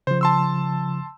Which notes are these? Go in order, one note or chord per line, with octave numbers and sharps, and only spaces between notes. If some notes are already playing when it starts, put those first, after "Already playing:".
C#3 F3 C5
A5 C6 E6